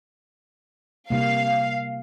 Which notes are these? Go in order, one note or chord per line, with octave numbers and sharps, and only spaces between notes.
C3 G3 A#3 F5